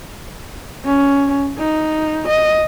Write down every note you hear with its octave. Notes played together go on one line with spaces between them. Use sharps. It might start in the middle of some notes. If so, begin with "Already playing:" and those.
C#4
D#4
D#5